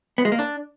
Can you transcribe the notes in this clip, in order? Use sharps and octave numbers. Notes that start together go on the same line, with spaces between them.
B3
G#3
A#3
D4